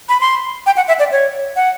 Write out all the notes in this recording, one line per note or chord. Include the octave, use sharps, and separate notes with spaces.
B5
C6
G5
F#5
E5
D5
C#5
F#5